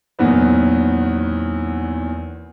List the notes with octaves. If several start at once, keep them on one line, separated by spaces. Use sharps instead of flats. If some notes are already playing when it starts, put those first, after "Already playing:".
E2 A#2 D#3 F#3 B3 C4